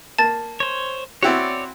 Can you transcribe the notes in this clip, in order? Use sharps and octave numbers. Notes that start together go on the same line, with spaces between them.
A#3 A5 A6
C5 C#5
C4 E4 F#4 C#5 D5